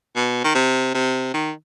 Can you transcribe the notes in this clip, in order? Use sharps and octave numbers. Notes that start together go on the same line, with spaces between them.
B2
D#3
C3
C3
D#3